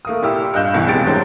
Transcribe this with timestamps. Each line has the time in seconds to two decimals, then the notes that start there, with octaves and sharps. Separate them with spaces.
0.05 A3 A#3 D#6
0.23 A#2 E4 G4 E6
0.54 G2 F4 D#5 F#6 G6 E7
0.74 B1 B2 E3
0.87 A#1 F2 G#3 G4 A6 D7
1.05 E1 E2 G2 B2 F#3 C5